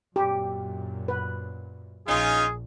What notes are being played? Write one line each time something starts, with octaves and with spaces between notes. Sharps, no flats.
F#2 A#2 G4
B4
A#1 C#4 D#4 F4 G#4